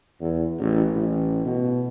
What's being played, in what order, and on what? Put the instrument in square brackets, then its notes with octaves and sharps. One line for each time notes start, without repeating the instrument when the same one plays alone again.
[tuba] E2
A1
A1
B2